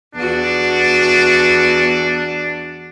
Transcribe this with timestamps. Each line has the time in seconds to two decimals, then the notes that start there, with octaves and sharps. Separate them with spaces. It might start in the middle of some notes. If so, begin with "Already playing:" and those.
0.15 E2 D4 F#4